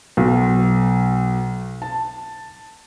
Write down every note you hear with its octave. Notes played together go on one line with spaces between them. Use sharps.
B1
A5